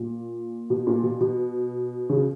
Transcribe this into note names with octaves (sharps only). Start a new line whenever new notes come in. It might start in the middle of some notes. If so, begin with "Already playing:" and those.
Already playing: A#2
B2
A#2
B2
B2
C#3